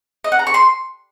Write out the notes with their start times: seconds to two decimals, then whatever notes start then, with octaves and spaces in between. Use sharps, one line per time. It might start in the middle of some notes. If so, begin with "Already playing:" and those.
0.24 D#5
0.32 F#5
0.39 A#5
0.47 C#6
0.54 C6